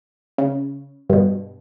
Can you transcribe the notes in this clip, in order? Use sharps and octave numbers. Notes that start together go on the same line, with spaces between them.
C#3
G2 B2